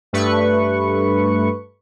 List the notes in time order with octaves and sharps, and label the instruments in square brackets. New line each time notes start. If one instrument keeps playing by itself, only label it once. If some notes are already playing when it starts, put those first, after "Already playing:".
[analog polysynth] G2 A3 B4 C#6